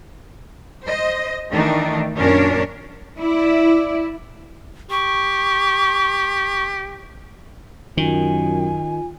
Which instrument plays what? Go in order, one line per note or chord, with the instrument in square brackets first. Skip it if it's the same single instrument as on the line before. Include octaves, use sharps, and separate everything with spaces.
[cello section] C5 D#5
D#3 E3 A3 D4 D#4
F#2 A#2 C#4 D4 A#4 C#5
E4 D5
[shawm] G4 [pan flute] C#6
[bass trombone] F#2 [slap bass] D#3 [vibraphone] F4 [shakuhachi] G#5